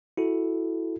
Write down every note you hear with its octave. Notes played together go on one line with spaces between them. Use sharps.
E4 F#4 A4